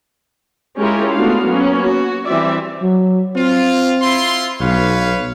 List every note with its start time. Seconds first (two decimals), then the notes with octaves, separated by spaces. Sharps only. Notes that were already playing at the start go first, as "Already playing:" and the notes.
0.78 G#3 C#4 E4 F4 G4 A#4
1.14 A3 B3 D4 F4 F#4 F5
1.45 F#3 A#3 B3 C#4
1.80 F#4
2.26 E3 G3 C4 D5 E5
2.82 F#3
3.36 C4 F4
4.02 E4 F4 C6
4.61 B1 B4 C#5 F5